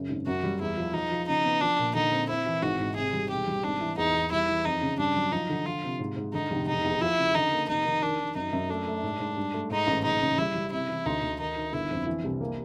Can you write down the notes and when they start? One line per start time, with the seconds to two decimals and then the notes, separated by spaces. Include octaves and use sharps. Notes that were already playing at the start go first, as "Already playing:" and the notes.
Already playing: F#2 C#3
0.09 G#1
0.26 F#2 F#4
0.43 G3
0.61 E2 E4
0.77 F3
0.94 F3 D#4
1.11 F3
1.28 C#3 D#4
1.45 B3
1.61 F3 D4
1.79 A#2
1.95 D3 D#4
2.12 C4
2.29 C4 E4
2.46 E3
2.62 G#1 F#4
2.80 G#2
2.96 C3 G#4
3.13 G3
3.30 E1 G4
3.47 G3
3.63 G#1 D4
3.81 E3
3.97 E2 D#4
4.14 E2
4.32 G3 E4
4.48 E3
4.65 F2 D#4
4.81 C#3
4.99 G2 D4
5.16 F#3
5.32 F3 D#4
5.49 D3
5.66 F3 F4
5.84 C3
5.99 G#2
6.16 G#2
6.33 D3 D#4
6.51 F1
6.67 E1 D#4
6.85 E2
7.01 F3 E4
7.18 C#3
7.35 D3 D#4
7.52 A#3
7.68 F1 D#4
7.85 D#3
8.02 D#3 D4
8.19 D#3
8.35 F#2 D#4
8.53 F#2
8.69 A3 D4
8.87 A3
9.03 G#2
9.20 G#2
9.37 G2
9.54 A3
9.70 G#2 D#4
9.87 A1
10.04 F#1 D#4
10.21 C#3
10.38 G3 E4
10.55 G3
10.72 C3 E4
10.89 E3
11.06 D2 D#4
11.22 D2
11.39 D#3 D#4
11.56 D#3
11.73 G1 E4
11.90 F2
12.07 E3
12.24 C2
12.41 A#3